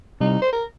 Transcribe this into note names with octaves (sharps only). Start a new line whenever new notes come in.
C3 G3 D#4
C5
A#4